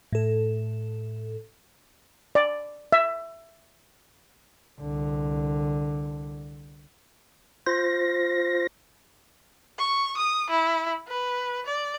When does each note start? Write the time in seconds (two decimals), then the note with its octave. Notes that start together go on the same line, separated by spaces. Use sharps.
0.13 A2 A4
2.35 D5
2.92 E5
4.79 C2 D3
7.67 F4 C5 A#6
9.79 C#6
10.17 D#6
10.50 E4
11.08 B4
11.67 D5